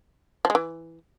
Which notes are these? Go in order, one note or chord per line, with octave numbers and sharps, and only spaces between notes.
F3
G#3
E3